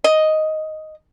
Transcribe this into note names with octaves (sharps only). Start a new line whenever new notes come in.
D#5